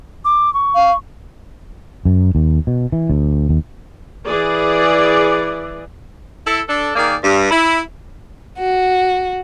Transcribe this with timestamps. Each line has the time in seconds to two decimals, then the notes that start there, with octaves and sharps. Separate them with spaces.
0.25 D6
0.54 C#6
0.75 F5
2.05 F#2
2.35 D#2
2.67 B2
2.92 E3
3.10 D2
3.49 D#2
4.26 E3 G#4 D5
6.45 E4 A4
6.68 D4 A4
6.96 D#3 A#3 G#4 D5
7.23 G2
7.51 E4
8.59 F#4